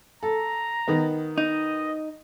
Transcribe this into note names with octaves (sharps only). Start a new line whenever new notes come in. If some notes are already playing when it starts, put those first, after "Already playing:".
A4 A#5
D#3 B3
D#4 D#5